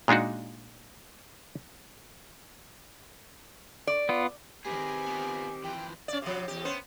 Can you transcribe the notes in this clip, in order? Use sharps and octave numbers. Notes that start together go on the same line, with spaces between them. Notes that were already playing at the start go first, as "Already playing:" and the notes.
A#2 G#3 D4 D#4 F#4
D5
B3 F4
D#3 C4 G4 G#4 B4 G#5
B3 F4
E3 F3 G5
C#4 D5
C3 F3
E2 G4
B3 C#4 C5